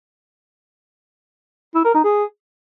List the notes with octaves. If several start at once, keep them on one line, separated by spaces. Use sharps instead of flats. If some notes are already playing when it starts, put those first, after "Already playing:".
E4
A#4
D#4
G#4